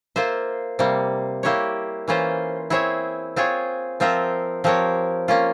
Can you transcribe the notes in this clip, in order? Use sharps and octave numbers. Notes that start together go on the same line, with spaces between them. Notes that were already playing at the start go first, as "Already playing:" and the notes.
A#3 F4 C5 E5
C3 G3 A#3
A#3 E4 G4 C#5
E3 A#3 C#4 F4 C5
C4 E4 G#4 C#5 E5
C4 F4 G#4 C#5
F3 C4 F4 A#4 E5
F3 C4 G4 A#4 C#5
A#3 C#4 F4